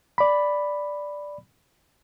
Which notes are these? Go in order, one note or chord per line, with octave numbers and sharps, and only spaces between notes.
D5 B5